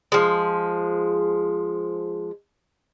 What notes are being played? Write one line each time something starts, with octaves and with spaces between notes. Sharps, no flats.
F3 G#3